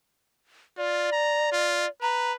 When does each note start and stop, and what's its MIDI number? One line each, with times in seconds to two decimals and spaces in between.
0.78 1.08 65
0.78 1.89 74
1.12 1.51 82
1.52 1.86 65
2.02 2.35 71
2.02 2.32 82